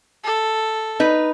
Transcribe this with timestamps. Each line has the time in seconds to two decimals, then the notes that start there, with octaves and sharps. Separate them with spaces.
0.24 A4
1.00 D#4 B4